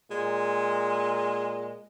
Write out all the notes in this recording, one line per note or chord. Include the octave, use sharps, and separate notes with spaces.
A#2 G#3